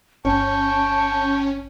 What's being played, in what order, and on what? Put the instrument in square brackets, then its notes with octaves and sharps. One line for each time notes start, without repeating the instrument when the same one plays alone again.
[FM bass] G1 [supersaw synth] C#4 [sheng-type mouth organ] G5 C#6 [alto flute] A5